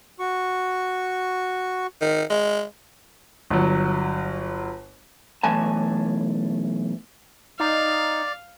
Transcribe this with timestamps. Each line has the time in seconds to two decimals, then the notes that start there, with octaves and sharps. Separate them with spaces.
0.19 F#4 C#6
2.01 D#3
2.30 G#3
3.50 G1 F#3
5.43 B1 E3 A3 G#5 A5
7.60 D#4 D5 F5